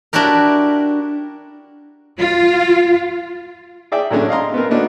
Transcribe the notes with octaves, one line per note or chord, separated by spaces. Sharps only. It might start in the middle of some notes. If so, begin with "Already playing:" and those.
D4 E4 F#4 G4 A#4
F4
G#4 D5 E5 G5
A2 F#3 G#3 A3 C#4 D4
D#5 F5 A#5 C6
B3 C4 A#4
A3 B3 D4 D#4 F#4